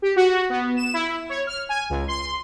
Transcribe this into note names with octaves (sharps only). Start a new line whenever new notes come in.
G4
F#4
B3
E7
E4
C#5
F6
G#5
C#2
C6